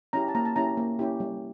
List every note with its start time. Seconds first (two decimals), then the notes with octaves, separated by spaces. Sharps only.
0.13 C#4 E4 G4 A#5
0.28 A5
0.35 A#3 A#5
0.45 A5
0.56 C#4 E4 G4 A#5
0.77 A#3
0.99 C#4 E4 G4
1.20 G3